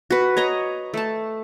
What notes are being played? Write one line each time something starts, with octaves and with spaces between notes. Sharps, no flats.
F#4 B4
C#5 D#5 A#5
A3 A5